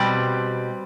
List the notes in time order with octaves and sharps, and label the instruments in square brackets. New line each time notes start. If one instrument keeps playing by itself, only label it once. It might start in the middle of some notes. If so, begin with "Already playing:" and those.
Already playing: [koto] B2 G3 C4 G4